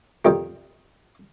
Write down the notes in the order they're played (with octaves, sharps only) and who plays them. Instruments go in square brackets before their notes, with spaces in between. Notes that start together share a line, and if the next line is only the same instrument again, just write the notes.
[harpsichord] F2 D#3 G3 A#4